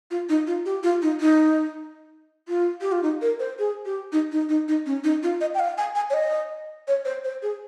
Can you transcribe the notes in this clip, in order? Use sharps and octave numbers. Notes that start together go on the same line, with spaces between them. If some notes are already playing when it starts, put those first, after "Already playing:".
F4
D#4
F4
G4
F4
D#4
D#4
F4
G4
F4
D#4
A#4
C5
G#4
G4
D#4
D#4
D#4
D#4
C#4
D#4
F4
D#5
G5
F5
G#5
G#5
C#5
D#5
C#5
C5
C5
G#4